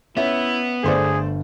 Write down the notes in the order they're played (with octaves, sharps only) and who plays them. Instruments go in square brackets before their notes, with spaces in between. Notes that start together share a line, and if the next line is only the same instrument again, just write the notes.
[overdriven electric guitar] B3 [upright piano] C#4 E5 [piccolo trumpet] E4
[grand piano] G1 [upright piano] A3 C5 D5 [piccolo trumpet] G#4